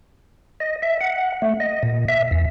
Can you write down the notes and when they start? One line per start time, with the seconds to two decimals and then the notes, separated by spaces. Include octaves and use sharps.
0.60 D#5
0.82 E5
1.01 F#5
1.42 A3
1.60 D#5
1.83 A#2
2.08 E5
2.31 E2